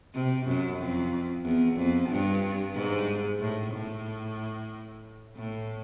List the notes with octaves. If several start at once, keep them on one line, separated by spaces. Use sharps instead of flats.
C3
F#2
F2
E2
F2
G2
G#2
A2
A2
A2